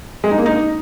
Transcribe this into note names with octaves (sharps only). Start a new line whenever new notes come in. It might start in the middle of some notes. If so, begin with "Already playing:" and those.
G#3
D#4
A#3
D#4